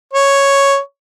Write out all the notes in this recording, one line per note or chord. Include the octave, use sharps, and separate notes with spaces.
C#5